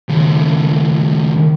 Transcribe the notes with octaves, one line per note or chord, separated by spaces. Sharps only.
D#2 C#3